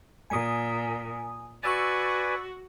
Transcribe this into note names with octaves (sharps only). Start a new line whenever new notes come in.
A#2 G#5 D#6
F#4 B4 D5 G#5 C#6 E6 A6